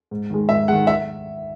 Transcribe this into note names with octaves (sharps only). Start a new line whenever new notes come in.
G#2
D#3 G#3
G#2 E5
D#3 G#3 F#5
E5